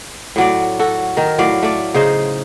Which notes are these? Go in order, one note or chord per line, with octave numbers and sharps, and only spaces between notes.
A2 F#3 D5
F#4 A4
D#3 A#4
A2 F#3 D5 F5
A3 D5
C#3 D#4 C5 D#5